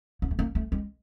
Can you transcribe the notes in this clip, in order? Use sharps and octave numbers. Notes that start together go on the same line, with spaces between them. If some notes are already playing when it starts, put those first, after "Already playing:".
B3
A3
A#3
A3
G#3